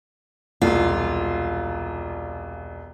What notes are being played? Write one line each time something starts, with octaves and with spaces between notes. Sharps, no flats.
E1 C2 F4